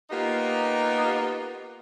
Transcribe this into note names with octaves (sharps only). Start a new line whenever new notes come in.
A#3 B3 D#4 F4 G4